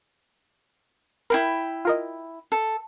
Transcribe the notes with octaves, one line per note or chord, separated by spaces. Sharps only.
E4 A#4 G5 B5 C7
F4 A#4 D#5
A4